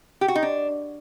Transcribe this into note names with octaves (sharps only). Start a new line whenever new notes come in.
G4
F#4
D#4
D4